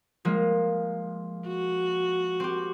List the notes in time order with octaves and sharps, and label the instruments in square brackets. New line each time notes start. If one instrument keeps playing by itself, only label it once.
[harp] F3 G#3 A#3
[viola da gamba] F#4
[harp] C4 G4